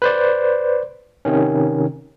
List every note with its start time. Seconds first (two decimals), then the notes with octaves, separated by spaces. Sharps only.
0.02 B4 C5 D5
1.25 C3 D#3 C#4